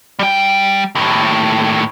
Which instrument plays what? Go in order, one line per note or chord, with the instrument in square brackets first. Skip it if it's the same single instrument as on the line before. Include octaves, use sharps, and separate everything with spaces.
[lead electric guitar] G3 G5
D#2 A2